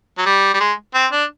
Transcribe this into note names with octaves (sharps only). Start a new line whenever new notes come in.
F#3
G3
G3
G#3
C4
D4